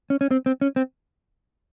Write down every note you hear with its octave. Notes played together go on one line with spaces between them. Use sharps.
C#4
C#4
C4
C4
C#4
C4